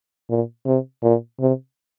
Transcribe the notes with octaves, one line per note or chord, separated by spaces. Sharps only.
A#2
C3
A#2
C3